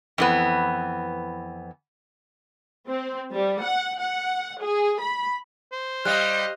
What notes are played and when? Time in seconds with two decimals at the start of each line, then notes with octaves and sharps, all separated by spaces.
0.18 F2 E3 B3
2.88 C4
3.33 G3
3.63 F#5
4.01 F#5
4.62 G#4
5.02 B5
5.72 C5
6.05 G3 D#5 F5 F#6